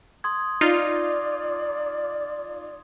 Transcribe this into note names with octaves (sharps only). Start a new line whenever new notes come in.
C6 D#6 G#6
D#4 F4 D5